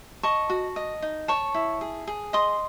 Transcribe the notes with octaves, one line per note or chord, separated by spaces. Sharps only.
D#5 A5 C#6
F#4
D#5
D#4
C#5 A5 C#6
E4
G#4
G#4
D#5 C6 D#6